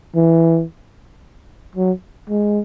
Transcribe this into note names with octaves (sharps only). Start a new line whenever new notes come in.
E3
F#3
G#3